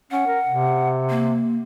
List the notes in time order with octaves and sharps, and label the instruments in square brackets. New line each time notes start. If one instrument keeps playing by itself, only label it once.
[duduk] C#4 [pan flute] F#5
[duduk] A#4
C3
[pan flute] A#3